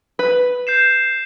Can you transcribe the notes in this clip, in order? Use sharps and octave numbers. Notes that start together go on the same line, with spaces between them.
B4
G6 C7 E7